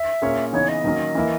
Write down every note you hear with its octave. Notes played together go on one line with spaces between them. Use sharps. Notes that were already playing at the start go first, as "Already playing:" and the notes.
Already playing: E5
A#2 A#3 C#4 G#4 C#5
C#3 E3 B3 D#4 C#5
D#5
D#3 F#3 A#3 C#4
E3 A#3 E4